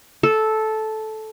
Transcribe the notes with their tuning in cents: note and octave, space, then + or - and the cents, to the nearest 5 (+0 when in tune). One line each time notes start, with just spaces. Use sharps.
A4 -10